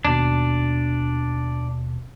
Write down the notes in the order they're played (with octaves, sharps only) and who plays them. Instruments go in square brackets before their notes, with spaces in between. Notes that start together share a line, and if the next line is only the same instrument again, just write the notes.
[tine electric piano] D#2 B2 [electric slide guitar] D4